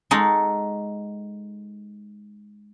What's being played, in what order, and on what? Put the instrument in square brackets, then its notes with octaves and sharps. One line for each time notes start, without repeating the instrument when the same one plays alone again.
[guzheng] G#3 D#4 F#4 A4